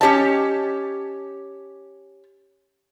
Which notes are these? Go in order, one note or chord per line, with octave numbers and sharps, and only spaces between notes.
C#4 D4 G4 C#5 D#5 A5